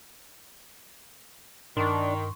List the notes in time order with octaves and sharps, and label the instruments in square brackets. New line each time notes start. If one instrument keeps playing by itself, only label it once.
[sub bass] G2 [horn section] D#3 [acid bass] D4 [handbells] C6 C#6